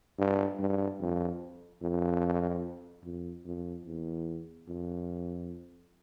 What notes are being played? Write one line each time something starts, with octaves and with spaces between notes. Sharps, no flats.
G2
G2
F2
F2
F2
F2
E2
F2